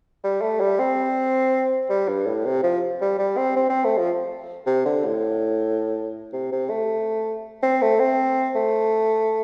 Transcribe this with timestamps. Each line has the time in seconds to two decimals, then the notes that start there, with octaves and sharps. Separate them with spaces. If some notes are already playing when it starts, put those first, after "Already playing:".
0.24 G3
0.42 A3
0.60 G3
0.79 C4
1.90 G3
2.08 G2
2.26 A2
2.45 C3
2.63 F3
3.01 G3
3.19 G3
3.37 C4
3.56 C4
3.69 C4
3.84 A3
3.98 F3
4.67 C3
4.85 D3
5.05 A2
6.33 C3
6.52 C3
6.70 A3
7.63 C4
7.82 A3
8.00 C4
8.55 A3